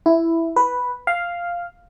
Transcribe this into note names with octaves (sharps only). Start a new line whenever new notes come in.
E4
B4
F5